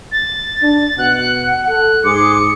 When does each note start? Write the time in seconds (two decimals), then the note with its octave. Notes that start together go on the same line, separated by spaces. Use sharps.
0.12 A6
0.62 D4
0.98 B2 F#5 F#6
1.69 A4 F#6
2.04 G#2 G#4 C6 D6 C#7